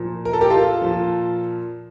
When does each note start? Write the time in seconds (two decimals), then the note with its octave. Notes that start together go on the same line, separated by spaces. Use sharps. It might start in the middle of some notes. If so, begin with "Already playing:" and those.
Already playing: A#2 F3
0.25 A#4
0.33 A4
0.41 G4 A#4
0.50 F4 A4
0.81 A#2 F3